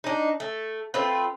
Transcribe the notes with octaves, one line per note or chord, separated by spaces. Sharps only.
D4 D#4
A3
A3 C4 F4 B4